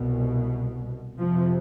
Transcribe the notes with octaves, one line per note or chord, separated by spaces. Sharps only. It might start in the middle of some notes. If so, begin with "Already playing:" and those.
Already playing: C2 B2
F2 C3 F3